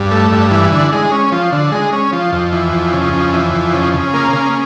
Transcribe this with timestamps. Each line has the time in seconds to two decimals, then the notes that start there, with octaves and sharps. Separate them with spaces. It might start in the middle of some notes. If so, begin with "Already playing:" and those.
Already playing: G2
0.11 A3
0.32 G2
0.51 E3
0.72 D3
0.92 G#3
1.12 C#4
1.32 F3
1.52 D3
1.72 G#3
1.92 C#4
2.13 F3
2.32 F2
2.53 E3
2.72 F2
2.93 C#3
3.13 F2
3.33 E3
3.53 F2
3.74 C#3
3.93 C#3
4.14 A#3
4.33 C#3